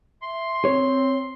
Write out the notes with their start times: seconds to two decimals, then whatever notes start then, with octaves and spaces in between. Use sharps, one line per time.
0.22 E5 C6
0.65 C4 C#5